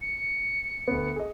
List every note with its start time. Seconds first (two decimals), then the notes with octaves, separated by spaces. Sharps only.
0.01 C#7
0.88 D2 B3
1.16 G#4 D#5